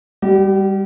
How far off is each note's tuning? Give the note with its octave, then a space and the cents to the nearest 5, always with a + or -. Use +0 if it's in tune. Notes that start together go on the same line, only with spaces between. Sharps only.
G3 +15 G4 -40